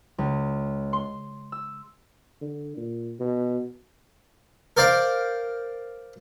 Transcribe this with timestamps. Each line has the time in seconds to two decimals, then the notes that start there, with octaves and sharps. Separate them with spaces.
0.18 C#2
0.93 C6
1.52 E6
2.41 D3
2.77 A#2
3.19 B2
4.77 A#4 C5 D5 F5 G5